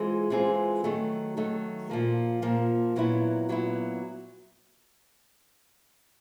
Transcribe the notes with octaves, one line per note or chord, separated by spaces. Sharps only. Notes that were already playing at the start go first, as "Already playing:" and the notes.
Already playing: E3 G#3 C4 F4 G#4
E3 G#3 C4 F4 G#4
D#3 F#3 A3
D#3 F#3 A3
A#2 F3 A#3
A#2 F3 A#3
A#2 F#3 B3 E4
A#2 F#3 B3 E4